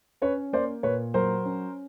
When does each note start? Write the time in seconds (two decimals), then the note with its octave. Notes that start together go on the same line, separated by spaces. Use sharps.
0.22 C#4 B4 C#5
0.53 A#3 C5 D5
0.83 A#2 B4 C#5
1.14 F#3 A#4 C5
1.45 C#4